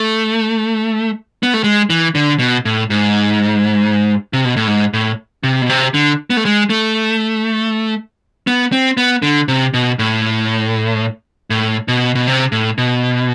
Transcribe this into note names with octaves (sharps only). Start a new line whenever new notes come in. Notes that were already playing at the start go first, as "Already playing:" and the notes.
Already playing: A3
B3
A3
G#3
E3
D3
B2
A2
G#2
C3
B2
A2
G#2
A2
C3
B2
C3
D3
B3
A3
G#3
A3
B3
C4
B3
D3
C3
B2
A2
A2
B2
B2
C3
A2
B2